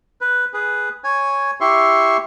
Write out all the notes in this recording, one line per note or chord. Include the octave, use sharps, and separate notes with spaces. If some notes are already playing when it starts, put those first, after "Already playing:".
B4
G#4 B4
C#5 G#5
E4 G4 E5 C6 C#6